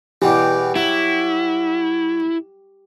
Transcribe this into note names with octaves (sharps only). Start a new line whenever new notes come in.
E2 B2 E3 G4
F#3 E4